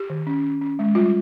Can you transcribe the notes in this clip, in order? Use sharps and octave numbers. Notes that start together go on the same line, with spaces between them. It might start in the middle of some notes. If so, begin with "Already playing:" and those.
Already playing: G4
D#3
C#4
C#4
C#4
G#3
G3 F4